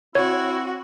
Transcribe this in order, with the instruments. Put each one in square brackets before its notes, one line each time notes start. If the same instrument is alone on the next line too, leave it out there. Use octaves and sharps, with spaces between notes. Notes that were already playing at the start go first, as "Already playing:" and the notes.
[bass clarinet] C4 [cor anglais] E4 [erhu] F#4 [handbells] C#5